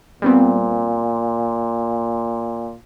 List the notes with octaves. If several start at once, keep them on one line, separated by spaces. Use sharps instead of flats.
A#2 G3 B3 C4